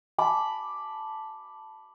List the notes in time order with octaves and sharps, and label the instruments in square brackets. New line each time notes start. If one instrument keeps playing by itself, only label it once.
[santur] A5 B5 D6